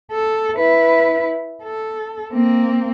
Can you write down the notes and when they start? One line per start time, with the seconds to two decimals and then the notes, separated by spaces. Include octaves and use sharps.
0.12 A4
0.57 E4 B4
1.64 A4
2.33 A#3 C4